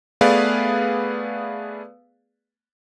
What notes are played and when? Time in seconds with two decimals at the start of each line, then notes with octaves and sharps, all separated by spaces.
0.21 A3 B3 G#4 B4 D5 F5